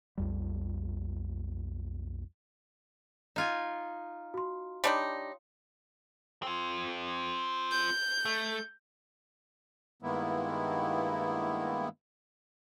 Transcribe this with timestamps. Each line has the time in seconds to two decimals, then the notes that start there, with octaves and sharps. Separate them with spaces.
0.18 B1 F2 G3
3.36 D#4 F4 G#5
4.34 F#4 C6
4.84 G3 D4 D#4 C#5 C6
6.43 C4 F4
7.72 G6
8.25 A3
10.02 G2 D#3 G#3 A#3 B3 E4